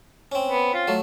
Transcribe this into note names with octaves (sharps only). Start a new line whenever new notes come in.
C4 C#4
B3
F4
F#3 A3